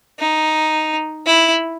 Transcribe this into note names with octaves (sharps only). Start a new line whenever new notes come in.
D#4
E4